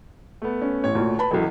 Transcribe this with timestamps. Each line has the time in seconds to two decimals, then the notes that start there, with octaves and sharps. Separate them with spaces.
0.42 A3 B3
0.61 C#4
0.84 A1 C#5
0.95 D2 A#2
1.18 B4 A5 B5
1.31 E1 C#2 E3 F#3 A4